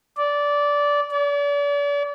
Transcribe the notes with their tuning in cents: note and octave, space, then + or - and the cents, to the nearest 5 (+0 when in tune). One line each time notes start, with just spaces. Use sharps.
D5 -15
D5 -40